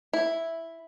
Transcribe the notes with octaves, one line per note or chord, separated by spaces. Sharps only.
E4